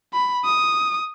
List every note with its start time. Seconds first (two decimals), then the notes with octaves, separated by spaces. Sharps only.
0.14 B5
0.45 D#6